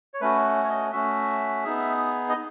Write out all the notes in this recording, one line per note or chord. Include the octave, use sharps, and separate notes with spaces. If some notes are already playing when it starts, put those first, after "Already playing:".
C#5
A3 C#4 F#4 B4
C#5
D#5
A3 C#4 F#4 E5
B3 D#4 G#4
D#5